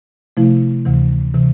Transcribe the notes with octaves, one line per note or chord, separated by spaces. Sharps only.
C3 F3 A3 E4
D2 C3 E3
C3 E3